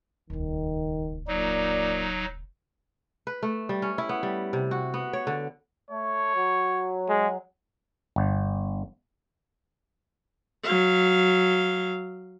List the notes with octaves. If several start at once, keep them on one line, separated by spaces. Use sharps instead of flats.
D#1 C#2 D#3
A#2 F#3 D#4 D5
B4
A3
G3
C#4
E4
B3
G3
C3
F#4
B3
C#5
D3
A3 C#5
F#3
G#3
G1
F#3 F5